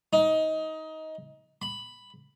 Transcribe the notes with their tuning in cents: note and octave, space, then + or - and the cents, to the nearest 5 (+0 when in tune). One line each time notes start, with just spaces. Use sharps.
D#4 +20
B5 +5